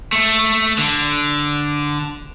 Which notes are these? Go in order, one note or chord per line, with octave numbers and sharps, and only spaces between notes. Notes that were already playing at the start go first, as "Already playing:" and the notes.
A3
D3